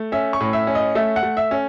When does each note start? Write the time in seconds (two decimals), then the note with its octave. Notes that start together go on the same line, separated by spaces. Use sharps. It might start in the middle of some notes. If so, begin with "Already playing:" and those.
Already playing: A3
0.12 C#4 E5
0.33 C#6
0.40 A2
0.53 E5
0.67 C#4
0.75 D#5
0.95 A3 E5
1.16 F#5
1.23 A3
1.37 E5
1.51 C#4